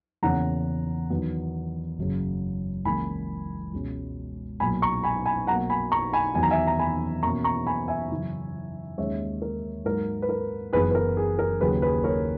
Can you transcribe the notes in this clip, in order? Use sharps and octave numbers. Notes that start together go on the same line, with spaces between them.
E2 C#3 E3 A#3 C#4 F#5 A#5
E2 D#3 F#3 B3
F#1 F#2 C#3
C#2 C#3 E3 A#3 G#5 B5
C#2 B2 G#3 C#4
B1 A#2 A#3 G#5 B5
A#5 C#6
G#5 B5
G#5 B5
B1 B2 A#3 F#5 A#5
G#5 B5
A#5 C#6
G#5 B5
E2 D#3 F#3 G#5
A#5
E5 G#5
A#5
G#5 B5
E2 B2 A#3 C#4 A#5 C#6
A#5 C#6
G#5 B5
E5 G#5
F#2 C#3 E3
D#2 D#3 G#3 C#4 C#5 E5
A#4
G#2 F#3 A#3 A#4
B4
A#4
F#1 F#2 E3 B3 G#4 B4
B4
A#4
G#4
A#4
D#2 C#3 F#3 G#4 B4
G#4 B4
A#4 C#5